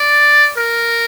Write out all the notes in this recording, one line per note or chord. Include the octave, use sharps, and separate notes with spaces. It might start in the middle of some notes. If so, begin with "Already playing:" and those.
Already playing: D5
A#4